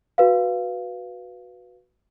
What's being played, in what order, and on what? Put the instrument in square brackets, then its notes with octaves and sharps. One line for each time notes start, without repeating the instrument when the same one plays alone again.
[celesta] F#4 B4 F5